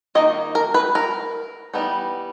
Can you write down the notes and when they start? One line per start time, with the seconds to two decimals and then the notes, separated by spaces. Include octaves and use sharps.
0.15 D#3 A#3 D#4 D#5
0.55 A#4
0.74 B4
0.95 A#4
1.74 E3 G3 B3 D#4